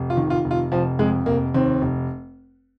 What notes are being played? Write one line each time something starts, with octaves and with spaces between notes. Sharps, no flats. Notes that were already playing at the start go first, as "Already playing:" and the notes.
Already playing: F1
F4
D#3
F4
F1
F4
F1 F3
F2 G#3
F1 A#3
D#2 C4
F1